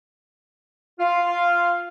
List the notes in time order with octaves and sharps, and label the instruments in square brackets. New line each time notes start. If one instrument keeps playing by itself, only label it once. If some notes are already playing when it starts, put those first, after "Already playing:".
[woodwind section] F4 F5